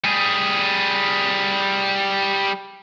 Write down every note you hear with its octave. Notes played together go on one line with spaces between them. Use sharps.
G3 G#4